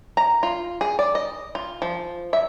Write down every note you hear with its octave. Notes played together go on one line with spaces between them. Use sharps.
A#5
F4
G#4
D5
D#5
F4
F3
E5